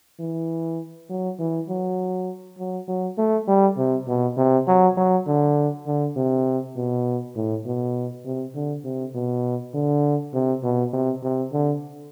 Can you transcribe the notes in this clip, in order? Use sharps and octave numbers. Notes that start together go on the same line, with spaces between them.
E3
F#3
E3
F#3
F#3
F#3
A3
G3
C3
B2
C3
F#3
F#3
D3
D3
C3
B2
A2
B2
C3
D3
C3
B2
D3
C3
B2
C3
C3
D3